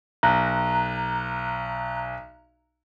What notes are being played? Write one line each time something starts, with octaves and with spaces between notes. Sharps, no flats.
B1 A#5 F#6